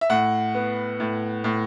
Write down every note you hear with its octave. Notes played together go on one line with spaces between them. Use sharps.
E5
A2 F#5
B3
A2
A2